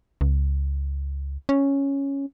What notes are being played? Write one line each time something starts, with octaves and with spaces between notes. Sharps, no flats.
C#2
C#4